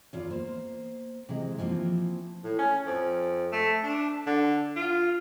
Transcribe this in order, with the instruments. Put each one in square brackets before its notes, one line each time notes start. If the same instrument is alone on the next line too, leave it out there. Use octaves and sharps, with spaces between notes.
[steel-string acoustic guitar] E2 F4 D5
A#3 C5
C3 E3 G#3
E3 F3 A#3 C4
[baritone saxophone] A2
C#4
F2
A3
D4
D3
F4